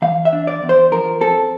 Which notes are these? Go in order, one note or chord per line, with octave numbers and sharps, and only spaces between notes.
E3 F5
E5
D4
D5
E2
C5
F3 A#4
C4 A4